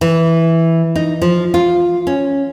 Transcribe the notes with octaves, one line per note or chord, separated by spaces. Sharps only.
E3
D#4
F3
F4
C#4